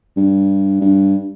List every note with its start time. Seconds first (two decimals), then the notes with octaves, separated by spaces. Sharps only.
0.17 G2
0.81 G2